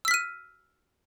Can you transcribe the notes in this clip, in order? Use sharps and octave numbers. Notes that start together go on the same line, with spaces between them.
E6 F6 B6 D#7